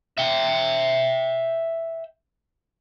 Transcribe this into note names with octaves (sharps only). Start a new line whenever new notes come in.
E5 G5